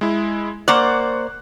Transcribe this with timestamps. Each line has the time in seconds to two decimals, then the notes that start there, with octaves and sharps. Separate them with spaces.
0.01 G#3 E4
0.68 A#3 C5 D5 F#5 C#6 F#6